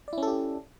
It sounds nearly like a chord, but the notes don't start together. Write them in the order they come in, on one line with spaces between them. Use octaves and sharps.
D5 E4 C#4 A4 G4